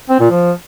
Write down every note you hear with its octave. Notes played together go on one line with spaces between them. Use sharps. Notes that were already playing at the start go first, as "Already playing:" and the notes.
C4
A#2
F3